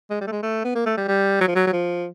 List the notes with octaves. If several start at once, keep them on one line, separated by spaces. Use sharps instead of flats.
G#3
G3
A3
G#3
A3
B3
A#3
A3
G3
G3
F#3
F3
F#3
F#3
F3